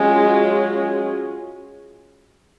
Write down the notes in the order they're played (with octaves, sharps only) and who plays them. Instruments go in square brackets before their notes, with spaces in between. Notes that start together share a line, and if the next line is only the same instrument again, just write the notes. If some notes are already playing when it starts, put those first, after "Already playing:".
Already playing: [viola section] F#3 C#4 F4 G#4 [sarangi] G#3